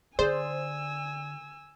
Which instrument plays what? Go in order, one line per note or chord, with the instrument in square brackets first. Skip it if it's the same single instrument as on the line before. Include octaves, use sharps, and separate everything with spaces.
[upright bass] D3 [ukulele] G#4 D5 [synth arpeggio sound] C5 [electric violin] G#5 E6